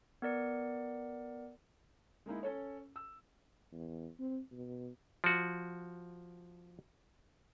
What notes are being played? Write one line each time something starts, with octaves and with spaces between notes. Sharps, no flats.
B3 A#4 D5 C#7
G#3 A#3 D#4 E4
C#4 A4 C#5
E6
E2
C4
B2
F3 F#4